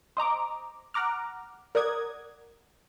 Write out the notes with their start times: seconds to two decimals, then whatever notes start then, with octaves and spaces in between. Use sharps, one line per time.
0.17 C5 D#5 A#5 D6
0.94 F#5 A#5 D6 F6
1.75 A#4 D5 F#5 D#6 G#6